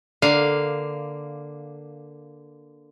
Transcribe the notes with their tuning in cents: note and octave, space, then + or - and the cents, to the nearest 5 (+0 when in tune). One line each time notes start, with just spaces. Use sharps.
D3 +0 A#3 +5 F5 +0